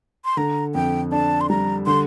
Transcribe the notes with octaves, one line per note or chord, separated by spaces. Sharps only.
C6
D3 A#5
F2 G5
D4 A5
C6
G3 A#5
D3 C6